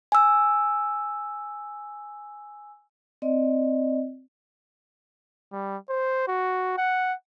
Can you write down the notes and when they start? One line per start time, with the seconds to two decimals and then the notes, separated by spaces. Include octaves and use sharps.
0.12 G#5 E6
3.22 C4 D5 D#5
5.52 G3
5.89 C5
6.28 F#4
6.78 F#5